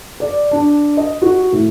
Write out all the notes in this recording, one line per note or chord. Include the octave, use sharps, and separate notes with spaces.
D5
D4
D#5
F#4
A2